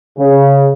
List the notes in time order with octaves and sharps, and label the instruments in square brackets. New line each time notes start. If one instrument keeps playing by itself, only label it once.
[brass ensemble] C#3